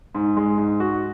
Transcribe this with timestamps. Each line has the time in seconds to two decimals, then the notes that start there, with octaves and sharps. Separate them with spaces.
0.15 G#2
0.37 G#3
0.58 G#2
0.80 F#4